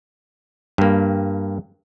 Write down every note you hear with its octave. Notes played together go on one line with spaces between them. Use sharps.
G2 A#3